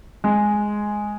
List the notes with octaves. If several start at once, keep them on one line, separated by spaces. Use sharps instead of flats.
G#3